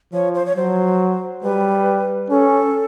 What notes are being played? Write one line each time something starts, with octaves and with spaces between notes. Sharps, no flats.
F3 C#5
C5
C#5
F#3 C5
G3 B4
C#4 A4